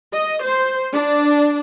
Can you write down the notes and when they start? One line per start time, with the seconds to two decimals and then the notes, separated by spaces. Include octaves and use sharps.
0.13 D#5
0.44 C5
0.93 D4